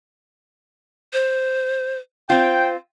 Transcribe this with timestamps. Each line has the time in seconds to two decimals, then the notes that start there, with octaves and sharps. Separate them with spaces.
1.13 C5
2.30 C4 F4 C5 G5